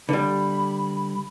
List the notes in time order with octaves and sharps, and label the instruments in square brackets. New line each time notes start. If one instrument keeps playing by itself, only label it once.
[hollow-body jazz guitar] D3 G3 [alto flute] B5